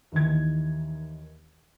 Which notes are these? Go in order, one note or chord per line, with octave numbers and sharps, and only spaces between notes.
D#2 D#3 E3 G#6